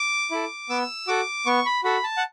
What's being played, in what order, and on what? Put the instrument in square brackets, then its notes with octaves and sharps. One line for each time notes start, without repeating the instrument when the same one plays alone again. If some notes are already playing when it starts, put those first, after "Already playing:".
Already playing: [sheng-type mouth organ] D6
E4 A4
B3 E6
F#4 A4 D6
B3 C#6
B5
F#4 A4 B5
A5
F#5